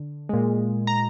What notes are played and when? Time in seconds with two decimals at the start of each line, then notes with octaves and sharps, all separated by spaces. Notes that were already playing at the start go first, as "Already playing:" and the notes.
Already playing: D3
0.29 A#2 G#3
0.87 A#5